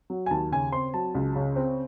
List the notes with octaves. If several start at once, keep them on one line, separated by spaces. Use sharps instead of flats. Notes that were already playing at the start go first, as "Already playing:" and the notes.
F#3
G#5
D#2 A5
C#3 G#5
C4 C6
F#3 A5
C#2
C#3
C4